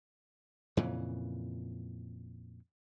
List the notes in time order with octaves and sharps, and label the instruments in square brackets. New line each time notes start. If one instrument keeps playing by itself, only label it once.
[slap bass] F2 A#2 C#3 E3